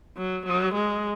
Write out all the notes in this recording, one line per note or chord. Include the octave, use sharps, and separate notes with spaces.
F#3
F#3
G#3